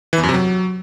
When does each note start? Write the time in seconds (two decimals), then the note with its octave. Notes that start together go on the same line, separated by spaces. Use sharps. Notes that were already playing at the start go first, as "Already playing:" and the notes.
0.13 E3
0.18 E2
0.23 F#2
0.29 C3
0.34 F#3